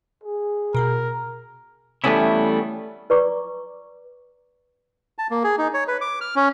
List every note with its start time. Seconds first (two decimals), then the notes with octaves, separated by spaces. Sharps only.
0.23 G#4
0.75 B2 F#4 A#4
2.04 E3 G3 A3 B3 C#4 E4
3.10 B4 D5 A#5 C#6 D6
5.18 A5
5.30 A#3
5.44 G#4
5.58 D#4
5.74 C#5
5.88 B4
6.01 D6
6.21 F6
6.36 C#4